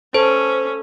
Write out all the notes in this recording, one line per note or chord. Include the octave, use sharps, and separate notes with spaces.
C#4 A4 C5